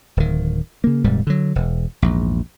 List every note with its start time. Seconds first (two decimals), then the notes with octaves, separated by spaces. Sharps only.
0.17 D1 D#3
0.84 C#3 A#3
1.04 D#1 G#2 C3 G3
1.27 D3 F#3
1.56 E1
2.02 A#1 E2 G#2